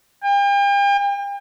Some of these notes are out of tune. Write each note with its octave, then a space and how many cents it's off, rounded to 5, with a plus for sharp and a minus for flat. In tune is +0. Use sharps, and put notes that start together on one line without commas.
G5 +40